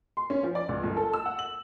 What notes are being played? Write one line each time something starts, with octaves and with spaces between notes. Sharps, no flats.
C6
C#4
F3
D5
C#2
G1
A4
E6
F#5
F#7